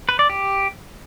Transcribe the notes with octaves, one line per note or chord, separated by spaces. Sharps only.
B4
D5
G4